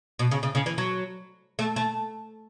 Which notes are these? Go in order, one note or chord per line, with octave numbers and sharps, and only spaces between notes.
B2
C#3
C#3
C#3
E3
F#3
A3
A3